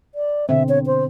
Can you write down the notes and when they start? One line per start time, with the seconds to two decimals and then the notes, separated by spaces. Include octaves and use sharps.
0.15 D5
0.49 B2 D3 C4 E5
0.69 C#5
0.86 C5